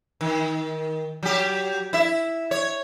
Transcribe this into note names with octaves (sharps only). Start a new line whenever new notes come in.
D#3
F#3 G4
E4 E5
C#5